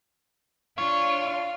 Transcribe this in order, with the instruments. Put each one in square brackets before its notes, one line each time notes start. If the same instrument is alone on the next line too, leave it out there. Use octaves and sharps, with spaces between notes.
[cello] D4 F4 [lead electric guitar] C#5 [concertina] F5